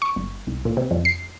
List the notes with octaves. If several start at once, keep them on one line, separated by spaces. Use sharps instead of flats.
C#6
G1
C2
A#2
C3
F2
C7